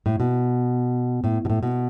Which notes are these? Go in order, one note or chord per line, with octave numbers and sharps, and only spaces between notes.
A2
B2
A2
B2
A2
B2